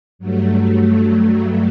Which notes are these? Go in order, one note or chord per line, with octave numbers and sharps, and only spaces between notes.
G2 F#3 A3